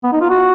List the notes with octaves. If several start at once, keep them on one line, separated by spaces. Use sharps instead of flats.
B3
D#4
F4
F#4